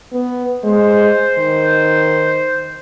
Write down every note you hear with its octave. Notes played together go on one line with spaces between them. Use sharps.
B3
G#3 C5
D#3